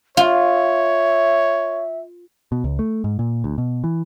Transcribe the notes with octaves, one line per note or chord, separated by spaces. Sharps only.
F4 C#5 E5
B2
C#2
A3
G#2
A#2
D2
B2
E3